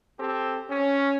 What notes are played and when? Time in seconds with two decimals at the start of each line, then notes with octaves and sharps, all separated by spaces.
0.19 C4 G4 A4
0.69 C#4